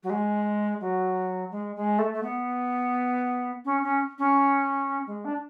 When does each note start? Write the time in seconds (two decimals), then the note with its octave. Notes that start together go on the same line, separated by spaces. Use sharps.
0.03 F#3
0.09 G#3
0.80 F#3
1.51 G#3
1.75 G#3
1.98 A3
2.13 A3
2.22 B3
3.65 C#4
3.82 C#4
4.18 C#4
5.06 G#3
5.24 D4